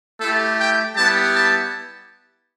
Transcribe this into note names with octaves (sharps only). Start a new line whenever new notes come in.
A3 E4 G4 A4
G5
G3 B3 E4 G4 A5
A5